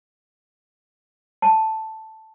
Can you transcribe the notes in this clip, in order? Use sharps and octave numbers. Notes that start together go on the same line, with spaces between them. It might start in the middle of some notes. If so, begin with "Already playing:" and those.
A5